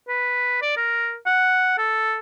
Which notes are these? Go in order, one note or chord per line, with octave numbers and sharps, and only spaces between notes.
B4
D5
A#4
F#5
A4